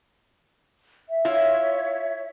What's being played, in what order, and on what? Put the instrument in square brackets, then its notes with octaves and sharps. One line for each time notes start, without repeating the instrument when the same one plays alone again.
[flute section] E5
[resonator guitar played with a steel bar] E4 F4 [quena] C#5